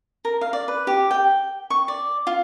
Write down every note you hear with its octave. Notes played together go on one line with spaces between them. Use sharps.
A#4
F5
D5
B4
G4
G5
C#6
D5
F4